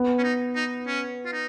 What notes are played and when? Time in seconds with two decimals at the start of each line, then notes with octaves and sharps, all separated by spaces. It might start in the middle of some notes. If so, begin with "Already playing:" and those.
Already playing: B3
0.18 C#4
0.23 D#4
0.55 D#4
0.86 C#4
1.26 F4
1.33 D#4